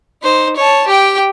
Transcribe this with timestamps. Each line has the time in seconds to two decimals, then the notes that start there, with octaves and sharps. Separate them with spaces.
0.23 D#4 C5
0.56 C#5 A5
0.87 G4 G5